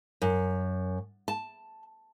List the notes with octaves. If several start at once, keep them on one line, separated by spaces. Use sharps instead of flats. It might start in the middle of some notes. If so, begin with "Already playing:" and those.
F#2
A5